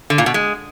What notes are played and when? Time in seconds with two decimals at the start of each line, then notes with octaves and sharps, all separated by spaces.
0.10 D3
0.18 A#2
0.26 B2
0.34 G#3